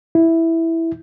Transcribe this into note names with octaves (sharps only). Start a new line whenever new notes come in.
E4